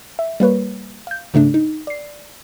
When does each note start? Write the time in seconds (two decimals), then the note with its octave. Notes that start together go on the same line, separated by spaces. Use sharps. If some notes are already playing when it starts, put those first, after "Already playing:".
0.19 E5
0.40 G3 A#3 B4 C#5
1.07 F5 G6
1.34 G#2 C#3 A3 D4
1.54 D#4
1.87 D5 C7